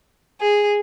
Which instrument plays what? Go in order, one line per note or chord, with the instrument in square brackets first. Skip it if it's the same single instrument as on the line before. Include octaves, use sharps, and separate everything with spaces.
[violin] G#4